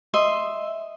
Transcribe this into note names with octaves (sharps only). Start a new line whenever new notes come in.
D#5 E5 C6